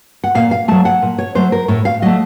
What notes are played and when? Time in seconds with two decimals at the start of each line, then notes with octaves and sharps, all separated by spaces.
0.24 F#5
0.35 A#2 F5
0.51 F5
0.68 F#3 A3 A5
0.85 F#5
1.02 A#2
1.18 C#5
1.35 F#3 A3 C5
1.52 A#4
1.68 A2 C#5
1.85 F5
2.02 F#3 A3 D#5